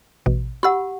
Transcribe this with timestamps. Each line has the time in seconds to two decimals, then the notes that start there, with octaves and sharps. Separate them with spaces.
0.26 A1 B2
0.63 G4 F#5 B5 E6